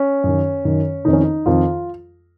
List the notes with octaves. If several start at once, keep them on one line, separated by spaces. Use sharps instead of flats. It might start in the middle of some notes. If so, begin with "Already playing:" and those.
Already playing: C#4
F#2 D#3
F#2 D#3
F2 D#3 D#4
C#4
D#4
F2 D#3 F4